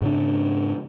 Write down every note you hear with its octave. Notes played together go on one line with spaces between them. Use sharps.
G#2 C#3 D4